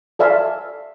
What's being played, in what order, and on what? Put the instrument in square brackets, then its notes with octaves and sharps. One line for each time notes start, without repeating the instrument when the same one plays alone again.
[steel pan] A4 D5 E5 F5 G#5